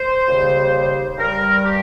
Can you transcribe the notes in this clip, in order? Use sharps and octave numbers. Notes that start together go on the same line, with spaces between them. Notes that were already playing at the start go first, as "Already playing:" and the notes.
Already playing: C5
D#2 C#3 G3
G2 G3 A#4
G4